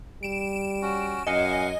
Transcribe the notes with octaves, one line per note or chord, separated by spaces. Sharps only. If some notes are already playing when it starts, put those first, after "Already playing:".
G3 D7 E7
C#4 F#4
F#2 D#5 F5 F#5 G#5